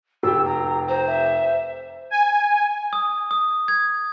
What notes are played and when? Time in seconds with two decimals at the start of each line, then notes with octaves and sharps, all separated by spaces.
0.23 F1 G4 E6
0.45 A#5
0.88 C5 A#5
1.07 E5
2.10 G#5
2.93 D#6
3.31 D#6
3.68 G#6